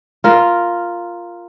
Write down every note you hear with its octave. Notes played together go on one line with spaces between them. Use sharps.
F4 A#4